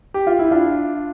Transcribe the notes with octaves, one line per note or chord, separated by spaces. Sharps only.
G4
F4
E4
D4 F4